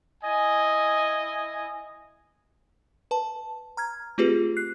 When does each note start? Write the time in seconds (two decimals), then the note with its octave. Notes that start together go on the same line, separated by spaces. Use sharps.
0.24 E4 D#5 G#5
3.11 B4 A5
3.77 A#5 F6 G#6
4.18 A3 C4 F4 G4 G#4 B4
4.57 F#6 C7